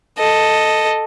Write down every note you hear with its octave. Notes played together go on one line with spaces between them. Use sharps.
A4 D#5